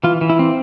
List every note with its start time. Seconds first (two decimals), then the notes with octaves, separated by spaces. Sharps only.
0.04 E3 F4
0.21 E3
0.30 E4
0.39 C4